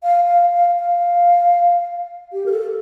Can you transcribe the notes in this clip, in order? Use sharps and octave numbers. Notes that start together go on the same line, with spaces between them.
F5
F5
F5
F5
G4
A#4
A4